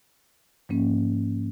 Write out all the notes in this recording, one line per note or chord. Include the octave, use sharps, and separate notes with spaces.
G#2 F3 A#3 C#4